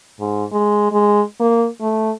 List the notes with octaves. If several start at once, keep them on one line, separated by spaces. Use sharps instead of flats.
G#2
G#3
G#3
A#3
A3